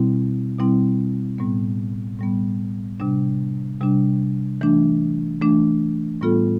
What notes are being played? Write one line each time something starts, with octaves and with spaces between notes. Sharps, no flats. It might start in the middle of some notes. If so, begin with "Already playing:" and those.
Already playing: B2 G3 C4 E4
B2 G3 C4 E4
A2 G3 B3
A2 G3 B3
C3 G3 D4
C3 G3 D4
E3 A3 D4
E3 A3 D4
A2 G3 B3 F4 A4